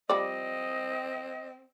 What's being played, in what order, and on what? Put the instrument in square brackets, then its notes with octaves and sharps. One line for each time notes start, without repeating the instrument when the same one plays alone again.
[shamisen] F3 G3 D5 [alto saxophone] C4 [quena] D#5